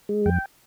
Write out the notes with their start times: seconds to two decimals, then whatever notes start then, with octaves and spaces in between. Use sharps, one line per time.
0.09 G#3
0.26 F2 G5